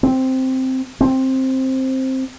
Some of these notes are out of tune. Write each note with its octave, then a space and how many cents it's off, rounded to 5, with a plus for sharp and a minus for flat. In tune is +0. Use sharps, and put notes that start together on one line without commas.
C4 +0
C4 +10